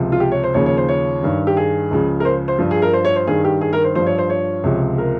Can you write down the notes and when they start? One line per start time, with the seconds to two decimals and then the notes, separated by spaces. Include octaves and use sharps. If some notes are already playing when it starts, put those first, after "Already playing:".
Already playing: C#2 C3 F3
0.12 F4
0.20 G4
0.32 C#5
0.44 C5
0.54 D#2 C#3 F3 C#5
0.66 C#5
0.77 C5
0.89 C#5
1.23 G2 D#3
1.47 G4
1.57 G#4
1.91 C#2 C#3 F3
2.20 A#4
2.25 C5
2.48 C5
2.59 G2 F3
2.71 G#4
2.82 A#4
2.93 C5
3.05 C#5
3.16 C5
3.27 G2 D#3 G#4
3.44 G4
3.61 G#4
3.73 A#4
3.84 C5
3.95 G2 F3 C5
4.07 C#5
4.18 C5
4.30 C#5
4.63 C#2 C3 F3
4.98 A#4